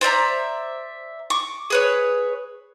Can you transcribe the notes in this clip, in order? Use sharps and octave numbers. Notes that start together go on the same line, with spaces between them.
C5 D5 E5 A#5
C#6 D6
G#4 B4 C#5